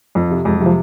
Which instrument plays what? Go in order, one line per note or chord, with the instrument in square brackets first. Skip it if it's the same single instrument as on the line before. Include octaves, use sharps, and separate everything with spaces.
[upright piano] F2 [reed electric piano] F3
[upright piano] C3
[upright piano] F2 [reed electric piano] G#3
[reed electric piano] F#3
[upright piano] C3
[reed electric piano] F3